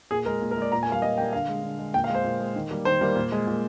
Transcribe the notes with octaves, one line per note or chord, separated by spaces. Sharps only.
A#2 G#4
G#3 A#4
A#2
A#4
G#3 D5
A#2 A#5
G#5
G3 A#3 F5
A#2 D#5
G3 A#3 G5
D3 F5
G#3
D3
G#3
A#2 G5
F5
G#3
C5
A#2
G#3
D#3
G3 A#3
D#3 C5
G3 A#3
A#2
G#3
A#2